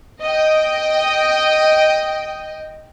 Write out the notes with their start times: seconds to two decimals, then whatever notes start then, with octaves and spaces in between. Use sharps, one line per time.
0.21 D#5 G5